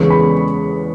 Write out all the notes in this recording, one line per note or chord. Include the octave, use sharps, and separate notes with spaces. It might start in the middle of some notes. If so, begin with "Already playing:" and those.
Already playing: E2 C#3 G#3 B3 C#6
B5